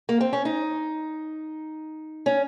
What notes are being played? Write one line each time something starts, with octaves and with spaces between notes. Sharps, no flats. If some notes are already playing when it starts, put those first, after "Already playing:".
A#3
C4
C#4
D#4
C#4